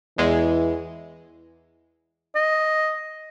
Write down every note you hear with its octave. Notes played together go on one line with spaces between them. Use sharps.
E2 E3 G#3
D#5